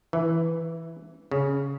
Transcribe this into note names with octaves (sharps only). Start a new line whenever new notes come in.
E3
C#3